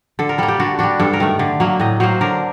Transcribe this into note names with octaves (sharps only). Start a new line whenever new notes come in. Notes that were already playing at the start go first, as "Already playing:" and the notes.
D3 A4
A#4
G3 A#3 A4
G4
D3 F#4
G3 D4 F#4
G2 A4
A#4
D#3 A3
D3
F#3 A#3
A2 D#5
F#3 A#3 C5
D3 A#4